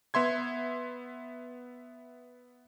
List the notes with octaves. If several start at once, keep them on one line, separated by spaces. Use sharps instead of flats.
B3 E5 C6 G#6